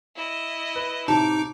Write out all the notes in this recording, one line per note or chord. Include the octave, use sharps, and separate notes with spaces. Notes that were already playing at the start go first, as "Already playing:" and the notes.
E4 D#5
B4
A2 C3 D#4 A5 D6